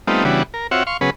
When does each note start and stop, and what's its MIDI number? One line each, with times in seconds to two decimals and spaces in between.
0.07 0.24 55
0.07 0.24 57
0.07 0.24 59
0.07 0.24 60
0.07 0.24 63
0.07 0.24 65
0.25 0.43 49
0.25 0.43 52
0.25 0.43 55
0.25 0.43 59
0.25 0.43 62
0.25 0.43 66
0.54 0.67 70
0.71 0.83 60
0.71 0.83 65
0.71 0.83 66
0.71 0.83 73
0.71 0.83 76
0.71 0.83 78
0.87 0.97 77
0.87 0.97 84
0.87 0.97 85
1.01 1.10 49
1.01 1.10 54
1.01 1.10 59
1.01 1.10 61
1.01 1.10 68
1.01 1.10 71